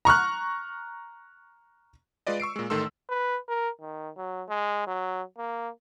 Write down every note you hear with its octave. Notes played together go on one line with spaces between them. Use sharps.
A#5 C#6 F6 F#6
G#3 F4 B4 D5 D#5
C#6 E6 C7 D7
A#2 G#3
A1 D#3 A3 A4 C6 E6
B4
A#4
D#3
F#3
G#3
F#3
A#3